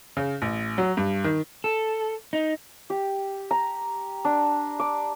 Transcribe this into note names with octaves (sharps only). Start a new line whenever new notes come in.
C#3
A1
F#3
G2
D#3
A4
D#4
G4
A#5
D4
D6